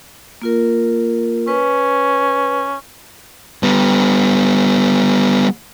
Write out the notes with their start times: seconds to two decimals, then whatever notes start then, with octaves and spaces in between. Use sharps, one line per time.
0.42 A#3 F4 A#4
1.48 C#4 B4
3.63 G3 B3